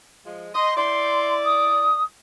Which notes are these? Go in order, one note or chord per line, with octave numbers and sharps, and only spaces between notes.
F3 G#3
D#5 C6
E4 D5 C6
D#6